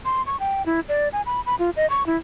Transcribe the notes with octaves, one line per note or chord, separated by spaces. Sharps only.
C6
C#6
G5
E4
D5
G#5
B5
B5
F4
D#5
C#6
E4